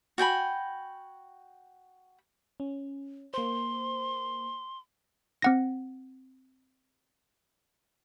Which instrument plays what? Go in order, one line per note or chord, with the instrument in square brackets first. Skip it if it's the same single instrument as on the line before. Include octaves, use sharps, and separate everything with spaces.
[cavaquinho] F#4 G5 G#5 B5
[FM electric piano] C#4
[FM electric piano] A#3 C5 [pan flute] C6
[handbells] C4 F#5 A#6